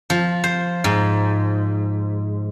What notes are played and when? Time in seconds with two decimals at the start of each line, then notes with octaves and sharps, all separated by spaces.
0.10 F3
0.44 C5
0.84 G#2